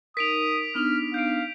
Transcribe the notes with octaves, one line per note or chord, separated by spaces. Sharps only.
D#4 A#4 D#6 B6 D7 F7
B3 D4 D#4 F6
F5 G6 D7